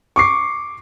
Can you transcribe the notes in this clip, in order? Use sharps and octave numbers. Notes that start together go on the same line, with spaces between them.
C#6 D6 C7